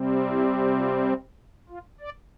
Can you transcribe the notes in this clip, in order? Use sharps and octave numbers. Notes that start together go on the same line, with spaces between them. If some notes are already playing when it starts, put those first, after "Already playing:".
Already playing: C3 G3 C4
E4
F4
F4
D5